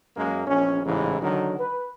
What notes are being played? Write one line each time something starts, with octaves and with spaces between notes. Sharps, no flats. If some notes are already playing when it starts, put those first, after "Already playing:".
F#2 G#3 A#3
A#1 E2 C#4
A1 G#2 C#3 E3
D3 D#3 F#3
B4